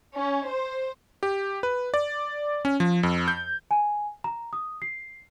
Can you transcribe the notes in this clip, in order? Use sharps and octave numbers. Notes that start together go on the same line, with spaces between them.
C#4
C5
G4
B4
D5
C#4
F3
F2
G6
G#5
A#5
D#6
C7